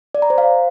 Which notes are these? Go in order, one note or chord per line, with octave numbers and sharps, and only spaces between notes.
D5
A#5
C5
F5